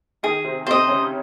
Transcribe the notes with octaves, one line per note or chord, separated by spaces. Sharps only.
D#3 D#4 G#4
C3 C4
C3 C4 C5 D#5
C#3 C#4